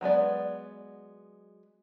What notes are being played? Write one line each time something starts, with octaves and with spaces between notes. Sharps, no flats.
F#3 G#3 B3 D5